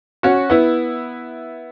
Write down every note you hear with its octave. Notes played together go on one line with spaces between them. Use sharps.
C#4 F#4
B3 E4